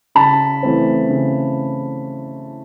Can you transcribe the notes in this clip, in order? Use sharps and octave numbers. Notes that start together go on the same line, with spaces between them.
C#3 A5 B5
E3 A3 C4
C#3